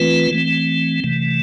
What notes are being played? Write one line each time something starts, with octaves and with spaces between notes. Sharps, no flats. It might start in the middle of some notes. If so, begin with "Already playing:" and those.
Already playing: E3 A3 C4 F4 B4
E3 A3 C4
C3 E3 A3